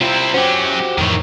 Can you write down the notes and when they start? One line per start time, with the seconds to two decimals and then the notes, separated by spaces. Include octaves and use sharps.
0.01 C3 C4 E4 F4 G5 A#5
0.34 F#3 C#4 F#4 G4 C5 G5
0.98 F2 A2 D#3 E3 A#4 C#5